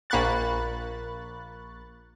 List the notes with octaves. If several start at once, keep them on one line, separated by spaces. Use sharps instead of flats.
A#1 A#3 B5 C#6 F#6 A6